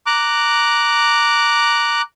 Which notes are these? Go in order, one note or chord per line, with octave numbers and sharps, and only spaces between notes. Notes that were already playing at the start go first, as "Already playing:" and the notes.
A#5 D6 F#6